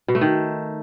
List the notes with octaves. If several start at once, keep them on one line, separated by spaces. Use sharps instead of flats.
B2
A3
D#3